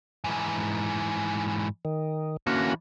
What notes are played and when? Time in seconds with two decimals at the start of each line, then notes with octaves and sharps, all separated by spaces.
0.24 G#2 E3
1.85 D#3
2.47 D3 E3 A#3 C#4 F#4